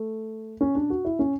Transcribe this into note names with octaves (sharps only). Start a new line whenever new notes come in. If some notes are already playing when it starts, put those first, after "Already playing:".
Already playing: A3
C#4
D4
F#4
E4
C#4